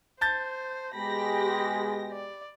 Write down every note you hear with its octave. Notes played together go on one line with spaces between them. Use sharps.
C5 A5 G6 A6
B2 G#3 G4 B5 A#6
D5